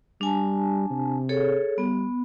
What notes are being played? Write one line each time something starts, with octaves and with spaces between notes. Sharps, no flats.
G3 D4 G#5 A5
C3
G#4 A4 C#5
G3 B3